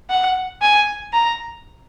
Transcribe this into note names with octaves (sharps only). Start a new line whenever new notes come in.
F#5
G#5
A#5